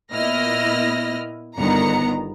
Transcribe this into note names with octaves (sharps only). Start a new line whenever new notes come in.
A#2 B3 E4 D#5 F6 A#6
G1 G2 D#3 B3 A#5 C#7